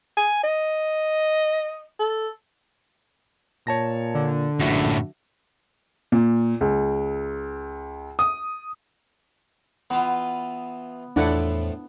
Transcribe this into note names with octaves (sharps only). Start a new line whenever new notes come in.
G#5
D#5
A4
A#2 C#5 A5 A#6
D3
A#1 F#2 A2 F#4 E5
A#2
C#2
D#6
E3 B3 F4 D#6
E2 A2 F3 A3 D4 E4 F#5